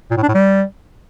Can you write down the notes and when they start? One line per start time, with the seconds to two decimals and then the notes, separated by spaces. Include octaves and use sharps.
0.11 A#2
0.17 A2
0.23 D4
0.28 A2
0.34 G3